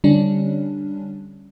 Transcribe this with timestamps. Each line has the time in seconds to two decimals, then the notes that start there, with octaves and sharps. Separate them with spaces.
0.04 D3 G3 C#4 D4